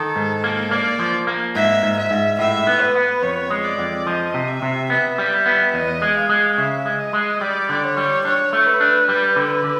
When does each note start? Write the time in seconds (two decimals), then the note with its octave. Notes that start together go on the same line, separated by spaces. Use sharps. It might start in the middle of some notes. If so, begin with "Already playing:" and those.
Already playing: D#3 A4
0.16 G#2
0.44 A#3
0.71 A#3 D5
1.00 F3
1.27 A#3
1.55 G#2 E5
1.83 G#2
1.97 E5
2.11 G#2
2.39 A2 E5
2.67 B3
2.81 B4
2.95 B3
3.22 F2 C#5
3.50 G#3
3.64 D5
3.78 F2
4.06 F3 D#5
4.34 C3
4.48 E5
4.62 C3
4.90 B3 E5
5.18 G3
5.46 B3
5.74 E2 D#5
6.02 G#3
6.16 F5
6.29 G#3
6.58 C#3 E5
6.86 G#3
6.99 D#5
7.13 G#3
7.41 G3 D5
7.69 D3
7.84 C#5
7.97 G3
8.25 D4 C#5
8.53 A3
8.66 B4
8.80 D4
9.09 G3
9.36 D3
9.64 D3